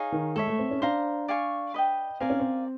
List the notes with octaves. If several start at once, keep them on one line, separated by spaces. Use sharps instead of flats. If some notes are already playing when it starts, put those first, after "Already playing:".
Already playing: D#4 G#4 C#5 F5
D#3
G#3 A4 C#5 E5
A3
C4
C#4
D4 C5 F5 A#5
D5 F5 G#5 C#6
B4 D#5 G5
C4 A#4 D5 F5 G#5
C#4
C4